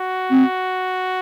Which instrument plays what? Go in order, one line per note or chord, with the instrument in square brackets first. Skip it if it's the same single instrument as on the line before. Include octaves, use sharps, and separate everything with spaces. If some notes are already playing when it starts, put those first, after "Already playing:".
Already playing: [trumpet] F#4
[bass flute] C4